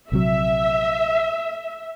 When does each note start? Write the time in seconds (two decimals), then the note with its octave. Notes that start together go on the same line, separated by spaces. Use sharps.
0.12 A#1 C3 F#3 E5